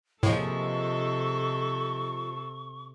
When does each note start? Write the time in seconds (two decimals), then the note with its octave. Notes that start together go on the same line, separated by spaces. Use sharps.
0.23 A2 C3 F3 G#3 A#3 A4 C#6